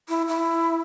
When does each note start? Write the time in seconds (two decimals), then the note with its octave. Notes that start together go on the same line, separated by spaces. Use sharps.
0.08 E4
0.28 E4